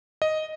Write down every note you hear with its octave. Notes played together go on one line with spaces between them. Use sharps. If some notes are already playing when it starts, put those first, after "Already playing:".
D#5